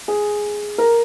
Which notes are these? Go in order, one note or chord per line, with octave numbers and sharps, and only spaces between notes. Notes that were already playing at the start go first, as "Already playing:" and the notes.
G#4
A#4